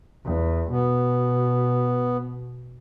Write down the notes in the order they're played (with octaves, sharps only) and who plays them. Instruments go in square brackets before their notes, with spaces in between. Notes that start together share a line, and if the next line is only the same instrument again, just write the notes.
[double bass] E2
[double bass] B2 [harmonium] B3